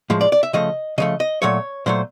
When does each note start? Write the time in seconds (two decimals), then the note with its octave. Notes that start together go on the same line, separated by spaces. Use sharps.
0.10 A2 F3 G#3
0.21 D5
0.32 D5
0.43 E5
0.53 C#3 F3 A3 D#5
0.98 C#3 F3 A3 D#5
1.20 D#5
1.42 A#2 F#3 A3 C#5
1.86 A#2 F#3 A3 C5